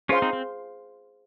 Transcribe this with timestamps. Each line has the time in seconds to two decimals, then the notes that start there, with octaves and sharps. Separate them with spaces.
0.09 C#4 F4 G#4 C5 F5 C6
0.22 C4 D#4
0.33 C4